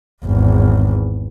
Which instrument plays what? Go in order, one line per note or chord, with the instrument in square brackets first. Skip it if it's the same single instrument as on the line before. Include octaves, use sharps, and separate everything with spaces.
[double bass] G#1 E2